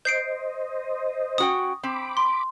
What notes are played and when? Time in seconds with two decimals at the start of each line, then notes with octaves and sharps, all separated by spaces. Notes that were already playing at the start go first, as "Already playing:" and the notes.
0.05 C5 D#5 G6 C7 D7
1.38 C#4 F#4 G5 D#6
1.83 C4 B5 D6
2.17 C6